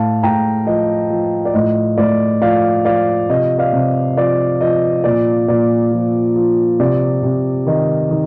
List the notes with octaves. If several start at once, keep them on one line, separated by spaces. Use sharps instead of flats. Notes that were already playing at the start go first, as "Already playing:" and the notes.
Already playing: A2 F5 A5
A2 G5 A#5
F3 D#5
F3
D5
A2 D#5
A2 D5
F3 D5 F5
F3 D5 F5
C3 D#5
D5 F5
C3
F3 D5
F3 D#5
A#2 D5
A#2 D5
F3
F3
C3 D5
C3
D#3 D#5
D#3